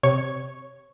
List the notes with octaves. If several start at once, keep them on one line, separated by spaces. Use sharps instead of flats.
C3 C#5 C#6